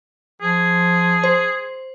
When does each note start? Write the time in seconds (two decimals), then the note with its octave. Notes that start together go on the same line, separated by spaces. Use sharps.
0.42 F3 G#4
1.24 C5